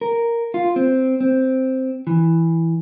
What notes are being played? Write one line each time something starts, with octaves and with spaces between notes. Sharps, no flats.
A#4
F4
C4
C4
E3